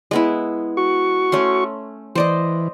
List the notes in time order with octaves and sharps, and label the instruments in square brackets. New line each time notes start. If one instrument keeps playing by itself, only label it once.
[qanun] G#3 B3 E4
[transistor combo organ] F#4 C#6
[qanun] A3 C#4 C6
[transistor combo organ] E3 [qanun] C5 D5 D#5